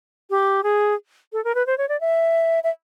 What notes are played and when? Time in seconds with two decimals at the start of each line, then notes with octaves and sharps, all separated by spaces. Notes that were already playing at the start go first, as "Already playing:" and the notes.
0.30 G4
0.63 G#4
1.33 A4
1.44 A#4
1.55 B4
1.67 C5
1.78 C#5
1.89 D5
2.01 E5
2.64 E5